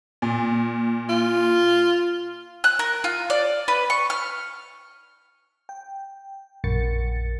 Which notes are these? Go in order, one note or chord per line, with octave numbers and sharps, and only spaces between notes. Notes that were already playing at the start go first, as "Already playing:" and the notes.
A#2
F4
F#6
A#4
F4
D5
B4
C#6
F6
G5
A#1 F#2 A6 C#7